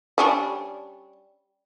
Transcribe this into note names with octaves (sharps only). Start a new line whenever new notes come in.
G3 C#4 D4